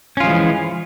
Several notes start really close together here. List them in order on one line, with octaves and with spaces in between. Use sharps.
C#4 F4 F3 G#3 E3